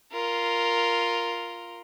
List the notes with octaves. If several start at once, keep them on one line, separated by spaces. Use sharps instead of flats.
F4 A#4